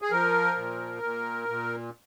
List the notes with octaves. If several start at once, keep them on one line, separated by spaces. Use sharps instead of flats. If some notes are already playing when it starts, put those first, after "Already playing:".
G#4
F3 A#4
A#2
A#2
A#2